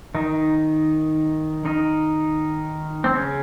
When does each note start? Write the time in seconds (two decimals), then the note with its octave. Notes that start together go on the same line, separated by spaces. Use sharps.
0.15 D#3 D#4
1.65 D#3 D#4
3.04 C4
3.15 C#3 C#4